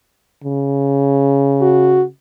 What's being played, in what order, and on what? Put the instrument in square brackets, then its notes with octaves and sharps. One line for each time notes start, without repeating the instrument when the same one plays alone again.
[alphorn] C#3
[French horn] F#4